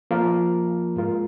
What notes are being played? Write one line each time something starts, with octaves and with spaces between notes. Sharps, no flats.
F3 A#3 F4 A#4
G#2 G#3 F4 A#4